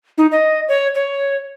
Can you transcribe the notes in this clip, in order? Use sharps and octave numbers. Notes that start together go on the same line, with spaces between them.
D#4
D#5
C#5
C#5